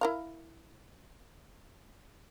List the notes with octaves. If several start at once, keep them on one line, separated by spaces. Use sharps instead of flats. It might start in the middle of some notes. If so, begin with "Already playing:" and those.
E4 A#4 F5